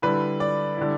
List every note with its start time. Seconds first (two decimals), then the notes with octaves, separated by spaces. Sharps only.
0.02 D3 G3 E4 B4
0.40 D5
0.77 D3 G3 E4